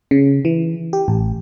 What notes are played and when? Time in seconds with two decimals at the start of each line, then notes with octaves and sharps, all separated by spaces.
0.11 C#3
0.45 E3
0.93 G4
1.08 A1